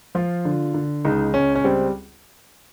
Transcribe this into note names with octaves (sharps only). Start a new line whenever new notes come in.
F3 F4
D3
D3
C#2 D#4
C#2 C#4
C#4
G3 C4